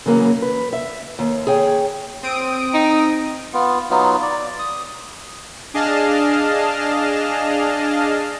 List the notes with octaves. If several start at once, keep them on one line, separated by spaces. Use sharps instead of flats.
C#3 E3 F#3 A#3 C4 C#4
B4
E5
D#2
G#4 C#5 G5
C4 D#6 D7
D#4
B3 F4
F#3 B3 D#4 F4
D5
D#6
D4 G#4 D#5 F5 A5 F6